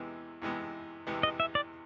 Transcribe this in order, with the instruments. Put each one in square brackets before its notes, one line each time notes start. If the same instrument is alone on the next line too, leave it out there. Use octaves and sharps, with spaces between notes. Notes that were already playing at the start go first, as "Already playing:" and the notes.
Already playing: [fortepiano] E2 C3 E3 G#3 B3
E2 C3 E3 G#3 B3
E2 C3 E3 G#3 B3
[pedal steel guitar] D#5
E5
D5